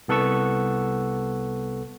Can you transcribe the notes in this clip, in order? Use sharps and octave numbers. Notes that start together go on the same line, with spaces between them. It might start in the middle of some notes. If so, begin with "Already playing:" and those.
C2 B3 A4 F#5 C#6 E6